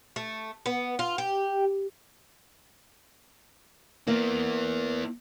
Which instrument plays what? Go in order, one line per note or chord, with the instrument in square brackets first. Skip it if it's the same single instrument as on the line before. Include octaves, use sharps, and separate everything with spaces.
[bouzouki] A3
B3
F4
G4
[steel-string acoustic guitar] A#3 [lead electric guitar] B3 E4